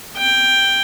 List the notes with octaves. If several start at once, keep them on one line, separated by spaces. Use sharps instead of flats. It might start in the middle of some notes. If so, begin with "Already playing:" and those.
G5